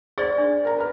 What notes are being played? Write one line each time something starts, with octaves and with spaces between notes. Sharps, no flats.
G#4 C5 D5 A6 A#6
D4
A#4 A#5
B4 F6